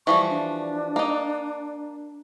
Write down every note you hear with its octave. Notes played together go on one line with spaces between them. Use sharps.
E3 F3 G3 C#6
D4
A#3 D#4